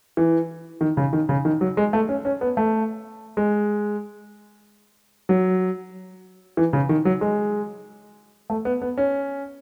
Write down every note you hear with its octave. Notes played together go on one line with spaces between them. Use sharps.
E3
D#3
C#3
D#3
C#3
D#3
F#3
G#3
A3
C#4
C#4
B3
A3
G#3
F#3
E3
C#3
D#3
F#3
G#3
A3
B3
B3
C#4